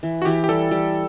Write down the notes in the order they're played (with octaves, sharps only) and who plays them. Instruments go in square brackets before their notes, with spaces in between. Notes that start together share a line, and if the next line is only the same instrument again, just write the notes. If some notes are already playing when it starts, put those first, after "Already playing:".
[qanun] E3
[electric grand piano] F#4
[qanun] E3 [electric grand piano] G4
[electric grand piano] G4
[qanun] G3 [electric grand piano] A4
[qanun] G3